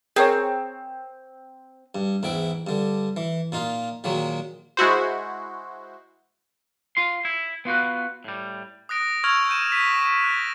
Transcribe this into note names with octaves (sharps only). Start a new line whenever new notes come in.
C4 G#4 A#4 C#5
G2
E2 G#2 E4 G5
G2 D3
E3
A#2 D#4 F4
A#2 D#3 F#3 G#3
G#3 E4 F#4 C5
F4 C6
E4
B3 F4 F#4 B4
A2 G3
D#6 F#6 A#6 D7
C#6 E6 F6 G#6 F7
G6 D#7 E7
B6 D#7
F#6 A#6